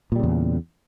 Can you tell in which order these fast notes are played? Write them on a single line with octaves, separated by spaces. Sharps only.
A#2 G3 C#3 E2